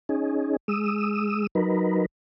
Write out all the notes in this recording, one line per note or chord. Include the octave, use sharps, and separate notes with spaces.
C#4 D#4 G#4
G#3 D#6 E6
F#3 D#4 A#4 B4